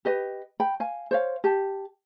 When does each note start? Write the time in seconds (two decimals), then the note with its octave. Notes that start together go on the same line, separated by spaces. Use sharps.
0.05 G4 B4 D#5
0.60 G5 B5
0.80 F5 G#5
1.11 C5 C#5 F5
1.44 G4 A5